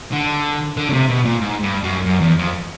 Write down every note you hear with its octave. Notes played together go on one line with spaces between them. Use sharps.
D3
D3
C#3
C3
B2
A#2
G#2
G2
F#2
F#2
E2
F2